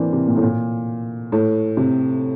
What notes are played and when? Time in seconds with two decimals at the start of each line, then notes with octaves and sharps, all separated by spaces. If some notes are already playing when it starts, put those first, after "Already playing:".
Already playing: E3 A#3 C4 D4
0.13 C3
0.27 A#2
0.37 A2
0.42 A#2
1.32 A2
1.77 C3